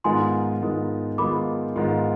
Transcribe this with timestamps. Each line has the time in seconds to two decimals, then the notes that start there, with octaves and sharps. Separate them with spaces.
0.04 G#2 D#3 G#3 B3 F4 G#5 C6
0.62 G#2 D#3 G#3 B3 F4
1.18 G#2 D#3 G#3 B3 F4 B5 D6
1.76 G#2 D#3 G#3 B3 F4